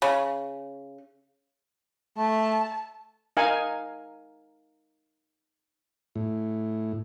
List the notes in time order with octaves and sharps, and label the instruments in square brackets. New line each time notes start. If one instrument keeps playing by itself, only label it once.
[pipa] C#3
[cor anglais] A3 [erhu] A5
[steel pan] D#4 A#4 F5 G#5
[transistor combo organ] A2